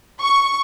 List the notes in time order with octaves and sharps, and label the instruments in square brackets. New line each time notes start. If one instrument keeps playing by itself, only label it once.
[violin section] C#6